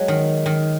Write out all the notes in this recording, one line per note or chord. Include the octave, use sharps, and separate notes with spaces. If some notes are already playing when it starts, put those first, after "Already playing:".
Already playing: F#3 G#3
D#3
D#3